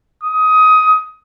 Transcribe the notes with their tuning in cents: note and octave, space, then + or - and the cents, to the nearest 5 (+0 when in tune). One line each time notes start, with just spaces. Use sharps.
D#6 +20